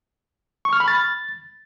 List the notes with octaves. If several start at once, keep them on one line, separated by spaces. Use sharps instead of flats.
C#6
F6
B5
A6